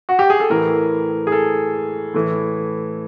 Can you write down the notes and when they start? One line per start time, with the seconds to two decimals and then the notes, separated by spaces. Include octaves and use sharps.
0.09 F#4
0.19 G4
0.30 G#4
0.40 A4
0.50 A2 E3 A#4
1.27 G#4
1.32 A4
2.14 A2 E3